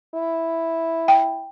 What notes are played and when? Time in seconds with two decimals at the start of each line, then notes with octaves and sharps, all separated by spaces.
0.14 E4
1.08 G5